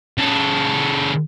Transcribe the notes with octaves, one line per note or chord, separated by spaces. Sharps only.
C#3 A4